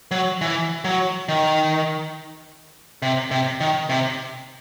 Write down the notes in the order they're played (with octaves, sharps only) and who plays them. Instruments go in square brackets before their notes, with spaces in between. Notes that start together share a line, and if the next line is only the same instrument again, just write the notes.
[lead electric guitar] F#3
E3
F#3
D#3
C3
C3
D#3
C3